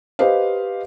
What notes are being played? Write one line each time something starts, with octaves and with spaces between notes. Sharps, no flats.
G4 B4 C5 D#5 F5